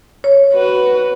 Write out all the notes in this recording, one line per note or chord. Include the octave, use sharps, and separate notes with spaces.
C#5
F#4 B4